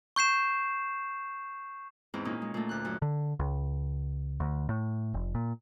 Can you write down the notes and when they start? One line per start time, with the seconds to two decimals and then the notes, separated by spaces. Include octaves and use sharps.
0.16 C#6 G6 C7 E7
2.14 E2 G#2 C4 E4
2.25 A#2 C#4 D#4
2.42 G#3
2.54 A#2 A3
2.69 D2 F#6
2.85 F#2
3.02 D3
3.39 C#2
4.40 D2
4.69 A2
5.14 F1
5.35 A#2